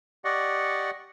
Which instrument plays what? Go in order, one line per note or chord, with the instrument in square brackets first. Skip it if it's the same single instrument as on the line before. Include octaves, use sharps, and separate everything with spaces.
[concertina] G4 D5 D#5 F#5 C#6